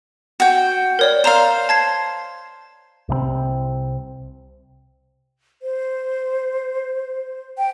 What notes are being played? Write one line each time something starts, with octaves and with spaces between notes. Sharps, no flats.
F#4 G5
A#4 C#5 D5
C5 D5 F5 A#5 E7
A5 G#6 C7
C2 C3 F#3 C4
C5
G5